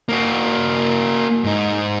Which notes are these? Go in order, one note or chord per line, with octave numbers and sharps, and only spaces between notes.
A#3 F#4
G#2 D#4